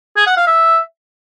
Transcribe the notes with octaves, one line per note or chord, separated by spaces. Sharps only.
G#4
F#5
F5
E5